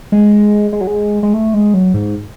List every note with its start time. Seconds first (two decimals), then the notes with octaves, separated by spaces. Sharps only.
0.12 G#3
0.73 G#3
0.81 F#3
0.87 G#3
1.23 G#3
1.33 A3
1.54 G#3
1.74 F#3
1.94 G#2